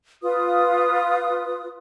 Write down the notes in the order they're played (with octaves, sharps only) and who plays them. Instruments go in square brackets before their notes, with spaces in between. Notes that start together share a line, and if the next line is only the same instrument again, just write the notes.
[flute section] F4 B4 D#6